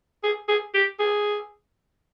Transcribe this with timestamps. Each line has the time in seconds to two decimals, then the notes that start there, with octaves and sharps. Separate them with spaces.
0.24 G#4
0.48 G#4
0.74 G4
0.99 G#4